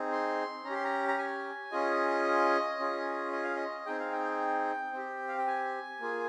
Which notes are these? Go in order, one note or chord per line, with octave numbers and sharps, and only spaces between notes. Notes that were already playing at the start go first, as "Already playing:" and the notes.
Already playing: C4 D#4 G#4
C6
C#4 A#5
G4
C6
A#5
A#5
G#5
C#4 F4 G#4 D#5
C#4 F4 G#4
D#5
F5
D#5
C4 D#4 G#4 G5
F5
G5
C4 G4
F5
G5
G#5
A#3 F4 G#4